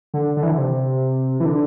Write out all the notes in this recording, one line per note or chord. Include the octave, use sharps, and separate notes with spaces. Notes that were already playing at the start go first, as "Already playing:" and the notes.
D3
D3
E3
D3
C3
E3
D3